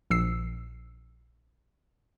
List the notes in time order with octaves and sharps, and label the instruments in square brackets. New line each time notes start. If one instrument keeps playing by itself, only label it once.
[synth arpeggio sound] A#1 E6 C7